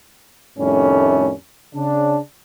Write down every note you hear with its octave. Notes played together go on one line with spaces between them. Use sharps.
F2 A2 D#3 G3 A3 C#4
C#3 D4